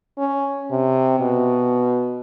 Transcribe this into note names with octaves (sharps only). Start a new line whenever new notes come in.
C#4
C3
B2